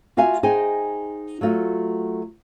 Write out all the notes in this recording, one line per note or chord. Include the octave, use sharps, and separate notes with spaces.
F4 F#4 E5 F5 G#5
D#4 G#4 C5 D#5 G5 G#5
F#3 A3 F4 F#4